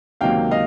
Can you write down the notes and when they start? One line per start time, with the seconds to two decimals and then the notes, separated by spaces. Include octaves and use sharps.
0.21 C#2 C3 D#3 F#3 A#3 F5 G5
0.51 D#5 F5